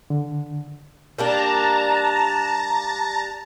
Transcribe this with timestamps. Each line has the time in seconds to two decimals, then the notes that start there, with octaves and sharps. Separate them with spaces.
0.10 D3
1.18 G3 A#3 D4 A5 A#5